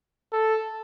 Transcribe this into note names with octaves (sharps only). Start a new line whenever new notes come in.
A4